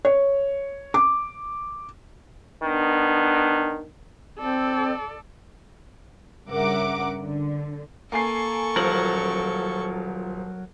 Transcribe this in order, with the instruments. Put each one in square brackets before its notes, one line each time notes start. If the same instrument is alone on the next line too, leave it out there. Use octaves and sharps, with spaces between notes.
[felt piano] C#5
D6
[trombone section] D#3 B3 D4
[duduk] C4 [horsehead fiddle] A4 D5
[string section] G2 C#3 A#4 E5 F#5 D6
D3
[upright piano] A#3 G#5 C7 [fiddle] A4 C#6
[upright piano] D#1 F3 F#7 [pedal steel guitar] F#3 A#4